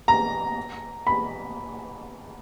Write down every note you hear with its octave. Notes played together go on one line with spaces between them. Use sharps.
A#5
B5